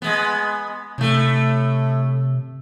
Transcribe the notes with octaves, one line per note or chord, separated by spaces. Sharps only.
G#3 B3
A2 C3 A3